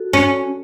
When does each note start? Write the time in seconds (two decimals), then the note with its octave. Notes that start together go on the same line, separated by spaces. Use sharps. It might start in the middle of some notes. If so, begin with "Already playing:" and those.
Already playing: F#4 A4
0.13 C#4